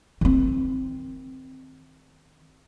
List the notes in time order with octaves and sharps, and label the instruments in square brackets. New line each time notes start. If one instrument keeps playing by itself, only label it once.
[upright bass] D#3 C4